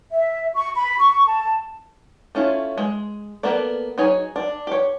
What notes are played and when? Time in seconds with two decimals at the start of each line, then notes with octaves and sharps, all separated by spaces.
0.12 E5
0.55 C#6
0.75 B5
0.98 C#6
1.27 A5
2.35 A3 C#4 E4 F4
2.77 G#3
3.43 A#3 B3 A4 A#4 D5
3.98 F#3 D#4 G#4 C#5 G#5
4.36 D4
4.67 G4 C#5